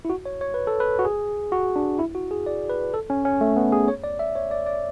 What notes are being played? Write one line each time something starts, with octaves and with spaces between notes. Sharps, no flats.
E4
F#4
C#5
C#5
B4
A4
B4
F#4
G#4
F#4
D4
E4
F#4
G#4
D5
B4
A4
C#4
C#4
A3
B3
G#4
C#5
D5
E5
C#5
D5
D5